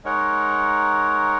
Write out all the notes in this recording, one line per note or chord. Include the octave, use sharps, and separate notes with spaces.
G#3 D#4 A#4 C#5 F#5